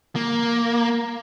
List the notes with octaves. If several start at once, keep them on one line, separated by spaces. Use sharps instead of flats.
A#3